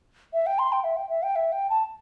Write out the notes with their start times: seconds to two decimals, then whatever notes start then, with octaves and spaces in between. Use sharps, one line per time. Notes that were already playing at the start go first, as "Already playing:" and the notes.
0.33 E5
0.47 G5
0.59 C6
0.72 G5
0.84 E5
0.97 G5
1.09 E5
1.23 G5
1.36 E5
1.52 G5
1.70 A5